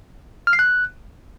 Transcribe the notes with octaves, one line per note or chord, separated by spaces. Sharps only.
F6
C7
F#6